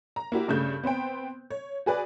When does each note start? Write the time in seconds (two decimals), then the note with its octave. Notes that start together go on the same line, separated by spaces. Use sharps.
0.16 A#5
0.32 A#3 E4 F#4 G4
0.48 G2 C#3 A3 G6
0.84 B3 C4 C5 G5
1.50 C#5
1.86 F#4 G#4 B4 D5